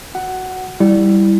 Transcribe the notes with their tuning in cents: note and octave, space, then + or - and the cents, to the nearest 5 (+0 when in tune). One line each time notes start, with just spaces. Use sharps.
F#4 +0 F#5 +10
G3 +0 E4 +0